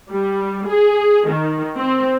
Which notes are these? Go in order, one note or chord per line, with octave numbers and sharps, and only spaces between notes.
G3
G#4
D#3
C4